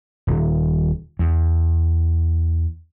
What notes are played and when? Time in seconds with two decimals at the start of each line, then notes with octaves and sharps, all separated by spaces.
0.27 D#1
1.19 E2